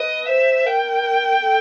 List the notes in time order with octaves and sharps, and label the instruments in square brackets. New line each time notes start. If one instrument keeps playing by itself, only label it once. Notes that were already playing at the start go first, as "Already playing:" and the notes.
Already playing: [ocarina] B4 [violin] D#5
[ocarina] C5 [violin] E5
[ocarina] A#4 [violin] G5
[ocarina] A4